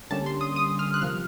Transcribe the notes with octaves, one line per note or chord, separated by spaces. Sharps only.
D3 G3 A#3 C#4 A5
C6
D#6
D#6
F6
F#6
C3 F3 A#3 F6